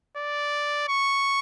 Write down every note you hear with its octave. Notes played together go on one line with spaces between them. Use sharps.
D5
C#6